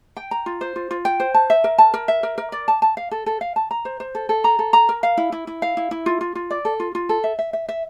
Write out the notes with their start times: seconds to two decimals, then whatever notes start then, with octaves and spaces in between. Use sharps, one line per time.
0.17 G5
0.31 A#5
0.46 F4
0.61 C5
0.76 F4
0.91 F4
1.05 G5
1.20 C5
1.34 A5
1.50 E5
1.64 A#4
1.78 A5
1.94 A#4
2.08 E5
2.23 A#4
2.38 A#4
2.52 D5
2.68 A5
2.82 A5
2.97 F5
3.11 A4
3.26 A4
3.41 F5
3.56 A5
3.71 A#5
3.85 C5
4.00 C5
4.15 A4
4.29 A4
4.44 A#5
4.59 A4
4.73 A#5
4.89 A#4
5.03 F5
5.18 E4
5.32 E4
5.47 E4
5.62 F5
5.77 E4
5.91 E4
6.06 F4
6.21 F4
6.35 F4
6.51 D5
6.65 A4
6.80 F4
6.95 F4
7.09 A4
7.24 E5
7.39 E5
7.53 E5
7.69 E5